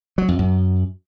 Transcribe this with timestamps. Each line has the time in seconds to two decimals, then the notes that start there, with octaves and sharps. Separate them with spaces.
0.18 F#3
0.28 F2
0.39 F#2